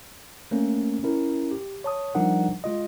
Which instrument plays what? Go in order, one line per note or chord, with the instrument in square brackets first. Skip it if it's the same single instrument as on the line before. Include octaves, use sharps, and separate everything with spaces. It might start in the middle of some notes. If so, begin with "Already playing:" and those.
[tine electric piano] A3 A#3 C4 C#4 A#4
C#4 E4 A#4
G4
C#5 A5 D#6
F3 G3 D4 D#4 A#4 F#5
G#3 F4 D#5